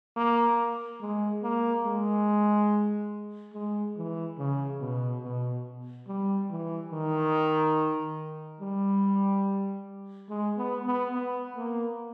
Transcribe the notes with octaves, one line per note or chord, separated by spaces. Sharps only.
A#3
G#3
A#3
G#3
G#3
E3
C#3
B2
B2
G3
E3
D#3
G3
G#3
B3
B3
B3
A#3